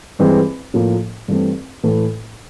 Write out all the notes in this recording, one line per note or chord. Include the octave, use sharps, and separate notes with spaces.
G2 E3 G#3 C4
A2 F3 A#3
G2 E3 A3 C4
A2 E3 A3